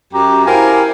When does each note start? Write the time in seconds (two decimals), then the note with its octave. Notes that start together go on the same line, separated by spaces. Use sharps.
0.13 F#2 G4 A#5
0.45 E4 G4 A#4 C5 F5 G#5